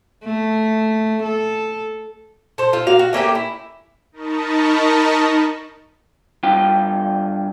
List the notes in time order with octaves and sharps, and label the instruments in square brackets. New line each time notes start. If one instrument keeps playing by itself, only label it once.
[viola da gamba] A3
A4
[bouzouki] A4 C5
F4 A4
A#3 F#4 F5
F#4
A3 A#3 C#4 G4
E4
[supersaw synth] D#4 A#4 D#5 A5 B5 C#6
[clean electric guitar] G2 F4 G5